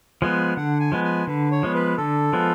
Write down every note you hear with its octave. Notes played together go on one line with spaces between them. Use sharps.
F3 G#3 B3 G#5
D3 F#5
G#5
F3 G#3 B3
G#5
D3 B4
C#5
F3 G#3 B3
B4
D3 A4
F3 G#3 B3